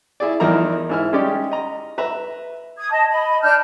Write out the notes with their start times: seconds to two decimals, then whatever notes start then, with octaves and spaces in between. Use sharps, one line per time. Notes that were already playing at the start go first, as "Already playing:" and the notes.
0.20 E4 G#4 D5
0.40 E2 F3 D#4 E4 A#4 A#5
0.89 G#2 E4 F6
1.13 G#3 C#4 D#4 G4 D5
1.51 D#5 A#5
1.98 B4 E5 A#5
2.78 D#6 G#6
2.91 D#5 A5
3.10 D#5 B5
3.42 D4 A5 F6 G6